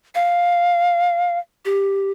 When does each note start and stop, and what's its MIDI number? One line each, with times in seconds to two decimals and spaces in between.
0.15 1.39 77
1.65 2.11 67